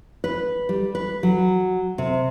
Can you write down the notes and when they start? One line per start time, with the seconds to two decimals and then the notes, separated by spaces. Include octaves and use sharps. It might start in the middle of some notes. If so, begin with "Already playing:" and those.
0.24 B4
0.69 G3
0.95 B4
1.23 F#3
1.98 C3